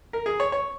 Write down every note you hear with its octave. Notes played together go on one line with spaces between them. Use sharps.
A#4
G#4
C#5
C#5